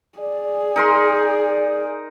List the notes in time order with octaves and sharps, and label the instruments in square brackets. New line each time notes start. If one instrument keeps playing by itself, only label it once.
[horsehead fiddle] G#4 [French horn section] D5
[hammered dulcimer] D#4 A#4 C6